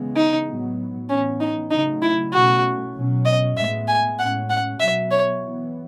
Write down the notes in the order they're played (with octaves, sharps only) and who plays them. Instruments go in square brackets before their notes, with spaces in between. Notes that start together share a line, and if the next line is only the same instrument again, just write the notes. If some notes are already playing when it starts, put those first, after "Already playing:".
Already playing: [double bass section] C#3 E3 G#3 B3
[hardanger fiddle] D#4
[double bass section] A2 F#3 B3
[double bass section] A2 E3 B3 [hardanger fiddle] C#4
[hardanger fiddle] D#4
[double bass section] C#3 F#3 A3 [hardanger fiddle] D#4
[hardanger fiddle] E4
[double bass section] B2 A3 C#4 [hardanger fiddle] F#4
[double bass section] B2 F#3 C#4
[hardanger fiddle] D#5
[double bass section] A2 G#3 B3 [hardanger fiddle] E5
[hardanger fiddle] G#5
[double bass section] A2 G#3 C#4 [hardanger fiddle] F#5
[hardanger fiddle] F#5
[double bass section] B2 F#3 B3 [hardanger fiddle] E5
[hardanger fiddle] C#5
[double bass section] E3 B3